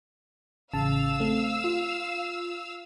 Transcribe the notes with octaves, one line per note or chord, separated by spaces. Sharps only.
A1 C#3 F5 A5 E6
A3 C4
F4